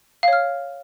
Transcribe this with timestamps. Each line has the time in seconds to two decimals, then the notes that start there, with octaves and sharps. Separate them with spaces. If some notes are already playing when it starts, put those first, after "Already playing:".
0.23 F5
0.28 C#5
0.33 F6